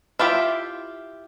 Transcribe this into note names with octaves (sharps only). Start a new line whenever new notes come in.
E4 F4 G4 E5